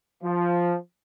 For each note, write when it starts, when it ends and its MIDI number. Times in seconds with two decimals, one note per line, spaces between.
0.23 0.75 53